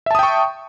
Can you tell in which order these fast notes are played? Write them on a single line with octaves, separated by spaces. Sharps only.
E5 A5 D#6 G5 C#6